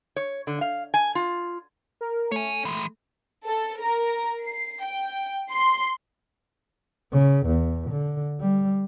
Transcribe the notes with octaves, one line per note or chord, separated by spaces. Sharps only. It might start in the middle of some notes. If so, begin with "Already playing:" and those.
C#5
D3
F5
G#5
F4
A#4
A3 C#5 G#5
E3 G#3
A4
A#4
C7
G5
C6
C#3
E2
D3
G3